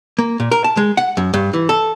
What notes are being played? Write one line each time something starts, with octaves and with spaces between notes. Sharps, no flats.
A#3
A#2
A#4
A5
G#3
F#5
F#2
G2
E3
A4